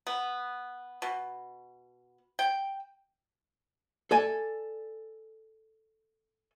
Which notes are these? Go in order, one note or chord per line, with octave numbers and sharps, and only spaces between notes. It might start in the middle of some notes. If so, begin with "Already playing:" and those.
B3
B2
G5
A4 D5 G#5